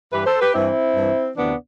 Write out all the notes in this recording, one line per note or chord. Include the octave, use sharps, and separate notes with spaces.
G2 E3 G4 B4
A4 C5
G4 B4
G2 E3 C4 E4
G2 E3
D2 C3 E3 B3 D4